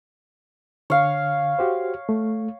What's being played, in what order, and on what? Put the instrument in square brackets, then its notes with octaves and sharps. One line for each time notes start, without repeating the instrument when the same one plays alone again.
[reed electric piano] D3 [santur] C#5 F5
[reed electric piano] F#4 G4 C5
A3